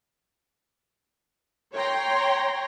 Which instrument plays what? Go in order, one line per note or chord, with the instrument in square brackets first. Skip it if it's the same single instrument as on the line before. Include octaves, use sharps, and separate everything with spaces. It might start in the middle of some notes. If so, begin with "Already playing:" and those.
[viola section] C#5 G5 A#5 C6